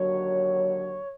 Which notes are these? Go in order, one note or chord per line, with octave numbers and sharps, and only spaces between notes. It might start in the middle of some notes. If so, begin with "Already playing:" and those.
Already playing: D#2 D3 F#3 C#5